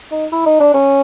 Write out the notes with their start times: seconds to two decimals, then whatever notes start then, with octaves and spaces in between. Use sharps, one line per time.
0.11 D#4
0.32 E4
0.46 D#4
0.60 D4
0.74 C#4